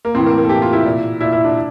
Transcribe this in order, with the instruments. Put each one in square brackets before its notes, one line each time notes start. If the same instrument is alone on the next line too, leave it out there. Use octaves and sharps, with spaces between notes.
[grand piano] A#3
A2 E3 C4
A#3
A#3
A4
A2 E3 G4
F4
E4
A#2
A#2 E4
E4
D4